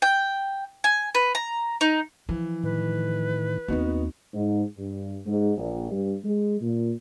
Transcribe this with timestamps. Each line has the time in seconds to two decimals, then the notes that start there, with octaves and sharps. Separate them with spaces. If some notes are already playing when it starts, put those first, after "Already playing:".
0.02 G5
0.84 G#5
1.15 B4
1.35 A#5
1.81 D#4
2.29 E3 F3
2.63 A2 D#3 B4
3.68 D#2 B3 C4 D#4 F#4
4.33 G#2
4.78 G2
5.25 G#2
5.57 A#1
5.91 G2
6.24 G#3
6.61 A#2